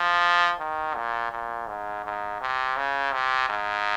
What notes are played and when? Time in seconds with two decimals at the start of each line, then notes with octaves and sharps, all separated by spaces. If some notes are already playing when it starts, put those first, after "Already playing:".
Already playing: F3
0.59 D#3
0.94 A#2
1.32 A#2
1.67 G#2
2.04 G#2
2.41 C3
2.76 C#3
3.12 C3
3.49 G#2